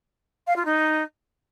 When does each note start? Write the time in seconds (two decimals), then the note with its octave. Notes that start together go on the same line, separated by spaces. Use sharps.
0.47 F5
0.56 F4
0.65 D#4